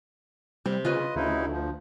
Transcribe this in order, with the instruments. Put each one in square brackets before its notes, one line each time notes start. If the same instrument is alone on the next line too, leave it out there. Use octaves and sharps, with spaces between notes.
[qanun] C3 [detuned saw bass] G3
[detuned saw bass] C#3 [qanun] F4 B4 [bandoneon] D#5
[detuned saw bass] D2 [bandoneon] C#3 D#4 E4
[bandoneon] F3